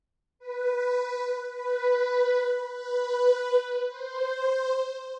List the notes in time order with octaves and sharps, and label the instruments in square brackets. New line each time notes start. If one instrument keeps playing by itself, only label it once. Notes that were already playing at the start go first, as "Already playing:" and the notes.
[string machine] B4
B4
B4
C5